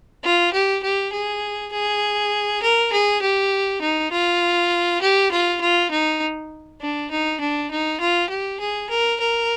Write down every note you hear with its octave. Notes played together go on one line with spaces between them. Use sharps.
F4
G4
G4
G#4
G#4
A#4
G#4
G4
D#4
F4
G4
F4
F4
D#4
D4
D#4
D4
D#4
F4
G4
G#4
A#4
A#4